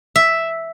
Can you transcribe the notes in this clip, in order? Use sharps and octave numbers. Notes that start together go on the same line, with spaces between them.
E5